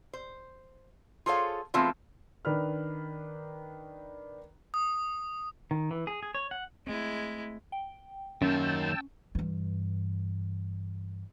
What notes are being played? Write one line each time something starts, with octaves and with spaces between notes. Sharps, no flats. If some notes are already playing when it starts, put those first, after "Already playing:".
C5
F4 G#4 A4 C5 C#5 F5
E3 G#3 A3 B3 C4 F4
D#3 D4 B4 F6
D#6
D#3
E3
G#4
G#4
C#5
F#5
G#3 A3 C4 E4
G5
F#2 D#3 A#3 C#4 G5 A5 E6
G2 E3